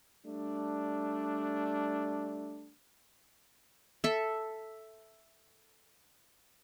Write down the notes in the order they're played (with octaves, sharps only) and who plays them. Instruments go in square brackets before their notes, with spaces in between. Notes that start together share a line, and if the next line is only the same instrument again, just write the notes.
[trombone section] G3 A3 D4
[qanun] A4 E5